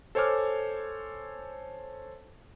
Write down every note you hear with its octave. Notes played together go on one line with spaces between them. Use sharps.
A4 C5 C#5 G#5 D6 F6